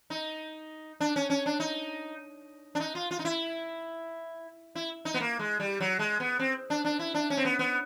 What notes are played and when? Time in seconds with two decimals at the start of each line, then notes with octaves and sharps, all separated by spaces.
0.10 D#4
1.00 D4
1.16 C#4
1.30 C#4
1.46 D4
1.60 D#4
2.75 D4
2.80 D#4
2.95 F4
3.11 F4
3.19 D#4
3.25 E4
4.75 E4
5.05 D#4
5.14 B3
5.20 A#3
5.39 G#3
5.60 G3
5.80 F#3
5.99 G#3
6.20 B3
6.39 C4
6.70 D4
6.85 D4
6.99 E4
7.14 D4
7.30 C#4
7.37 C4
7.45 B3
7.59 B3